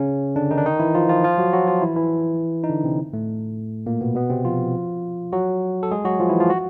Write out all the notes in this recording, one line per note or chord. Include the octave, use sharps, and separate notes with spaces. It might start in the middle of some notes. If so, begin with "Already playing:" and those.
Already playing: C#3 C#4
D3 D4
D#3 D#4
D4
D#3 D#4
E3 E4
F3 F4
F3 F4
F3 F4
F#3 F#4
F#3 F#4
F3 F4
E3 E4
E3 E4
D#4
D3 D4
C3 C4
A2 A3
A#2 A#3
B2 B3
B2 B3
C3 C4
F3 F4
F#3 F#4
A4
G#3 G#4
F#3 F#4
F3 F4
E3 E4
F3 F4
F#4